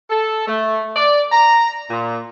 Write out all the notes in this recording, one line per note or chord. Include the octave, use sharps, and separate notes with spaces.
A4
A3
D5
A#5
A#2